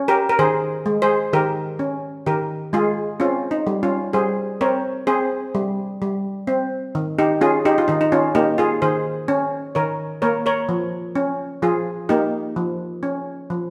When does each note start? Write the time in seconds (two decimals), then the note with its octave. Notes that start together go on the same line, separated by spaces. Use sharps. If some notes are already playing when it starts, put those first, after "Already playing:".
Already playing: C#4
0.08 G4 A#4
0.29 A#4
0.39 D#3 G#4 C5
0.86 G#3
1.02 G#4 C5
1.33 D#3 G4 A#4
1.79 C#4
2.26 D#3 G4 A#4
2.73 G#3 F4 G#4
3.20 C4 C#4 F4
3.51 D#4
3.67 G3
3.83 C#4 F4
4.13 G3 G#4 C5
4.61 C4 A#4 C#5
5.07 C4 G#4 C5
5.55 G3
6.02 G3
6.47 C4
6.95 D#3
7.19 D#4 G4
7.41 C#4 F4 G#4
7.65 D#4 G4
7.78 F4
7.88 D#3 D#4
8.01 D#4
8.12 C#4 F4
8.35 A#3 D#4 G4
8.58 F4 G#4
8.82 D#3 G#4 C5
9.28 C#4
9.75 D#3 A#4 C#5
10.22 A#3 A#4 C#5
10.46 A#4 C#5
10.69 F3
11.16 C#4
11.62 F3 F4 G#4
12.09 A#3 D#4 G4
12.56 F3
13.03 C#4
13.50 F3